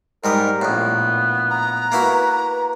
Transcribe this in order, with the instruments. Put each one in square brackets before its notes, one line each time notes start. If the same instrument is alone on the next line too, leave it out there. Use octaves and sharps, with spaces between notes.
[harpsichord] G#2 G3 D#6 [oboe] A#4
[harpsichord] A#1 A2 [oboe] B3
[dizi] A#5
[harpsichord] A#3 E4 F#4 [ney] B4